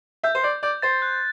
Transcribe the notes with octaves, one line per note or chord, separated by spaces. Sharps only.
E5 G6
C5
D5 G6
D5 G6
C5 A6
F#6